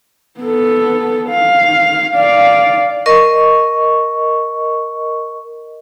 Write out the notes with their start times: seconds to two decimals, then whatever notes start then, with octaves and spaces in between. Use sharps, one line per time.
0.40 B3 A4
1.30 F5
2.16 D5 F5
3.06 A#4 D#5 C#6